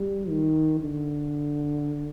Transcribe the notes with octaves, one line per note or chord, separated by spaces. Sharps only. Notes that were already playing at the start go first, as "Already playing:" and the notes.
Already playing: G3
D#3
D3